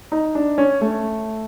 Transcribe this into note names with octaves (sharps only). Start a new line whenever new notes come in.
D#4
D4
C#4
A3